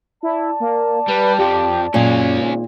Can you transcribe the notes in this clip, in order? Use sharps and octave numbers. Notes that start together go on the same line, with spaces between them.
E4 D5 A5
A#3
G3 B4
F2 F3 G4
F#2 A#2 G#3 C#4
G#1